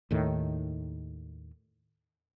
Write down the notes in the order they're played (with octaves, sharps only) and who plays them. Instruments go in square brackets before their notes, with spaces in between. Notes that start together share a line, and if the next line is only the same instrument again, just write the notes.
[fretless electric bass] D#2 A2 D#3